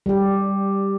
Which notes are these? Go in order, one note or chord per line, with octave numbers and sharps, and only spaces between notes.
G3 G4